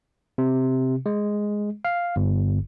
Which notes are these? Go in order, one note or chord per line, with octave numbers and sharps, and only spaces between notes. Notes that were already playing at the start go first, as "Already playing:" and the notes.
C3
G#3
F5
G1